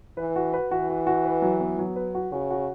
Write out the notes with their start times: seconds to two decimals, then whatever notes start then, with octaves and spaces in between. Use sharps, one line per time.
0.17 E3 B4
0.36 F#4
0.53 B4
0.71 E3 F#4
0.89 F#4
1.07 F#4
1.25 B4
1.42 F#3
1.60 B3
1.79 F#3
1.96 B4
2.15 F#4
2.32 C#3 F#4
2.51 F#4